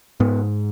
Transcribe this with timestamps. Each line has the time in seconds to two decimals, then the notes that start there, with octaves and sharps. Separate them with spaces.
0.20 G#2 B3